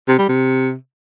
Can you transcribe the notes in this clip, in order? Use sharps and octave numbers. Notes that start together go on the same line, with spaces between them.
C3
G3
C3